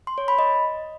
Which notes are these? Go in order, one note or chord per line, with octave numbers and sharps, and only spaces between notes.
C6
C#5
B5
D#5